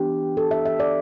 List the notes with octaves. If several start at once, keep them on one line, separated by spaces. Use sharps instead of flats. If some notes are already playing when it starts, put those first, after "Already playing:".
Already playing: E3 B3 D4 G4
A4
E5
E5
D5